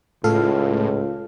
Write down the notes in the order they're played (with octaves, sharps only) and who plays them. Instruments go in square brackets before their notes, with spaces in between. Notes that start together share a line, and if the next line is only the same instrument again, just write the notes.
[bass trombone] C#2 [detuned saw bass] A2 [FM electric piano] F4 A4 F5